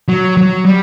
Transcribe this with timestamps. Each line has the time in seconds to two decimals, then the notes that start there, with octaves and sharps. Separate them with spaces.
0.09 F#3
0.37 F#3
0.65 G3